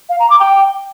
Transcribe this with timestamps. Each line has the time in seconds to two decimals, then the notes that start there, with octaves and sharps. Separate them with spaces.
0.09 F5
0.20 A#5
0.30 D6
0.40 G5